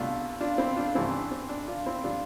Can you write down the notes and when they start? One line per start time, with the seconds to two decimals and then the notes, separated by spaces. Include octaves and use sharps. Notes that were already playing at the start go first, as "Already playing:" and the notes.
Already playing: C2 B2 A3 D4 F4
0.41 D4 F4
0.58 C4 E4
0.76 D4 F4
0.95 C2 C3 E3 A3 C4 E4
1.13 D4
1.31 C4
1.49 D4
1.67 D4 F4
1.86 C4 E4
2.04 D3 G3 C4 D4 F4